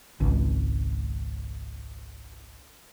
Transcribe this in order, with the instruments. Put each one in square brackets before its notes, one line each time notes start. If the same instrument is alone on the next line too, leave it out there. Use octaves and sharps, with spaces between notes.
[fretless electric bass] G#1 C#2